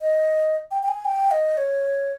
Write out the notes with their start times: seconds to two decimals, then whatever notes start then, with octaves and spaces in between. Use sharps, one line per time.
0.01 D#5
0.71 G5
0.83 G5
0.88 G#5
1.05 G5
1.31 D#5
1.57 C#5